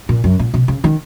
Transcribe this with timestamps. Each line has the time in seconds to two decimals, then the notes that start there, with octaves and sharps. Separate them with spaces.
0.09 A#2
0.24 F#2
0.39 A#2
0.54 B2
0.68 C#3
0.84 D#3